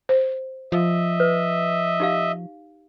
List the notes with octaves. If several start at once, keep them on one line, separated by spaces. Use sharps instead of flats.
C5
F3 D#5 E5
B4
D#4 G4 F5